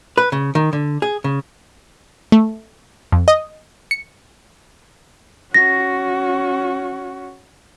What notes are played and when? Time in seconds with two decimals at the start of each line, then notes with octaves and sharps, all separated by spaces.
0.18 B4
0.32 C#3
0.55 D#3
0.73 D3
1.02 G#4
1.24 C#3
2.32 A3
3.12 F2
3.28 D#5
3.91 C#7
5.54 C#4 F#4 A#6